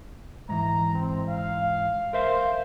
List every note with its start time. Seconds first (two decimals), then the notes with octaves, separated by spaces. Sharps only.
0.49 G#2 E3 A#5
0.94 C4
1.28 F5
2.13 A#4 C5 E5 F5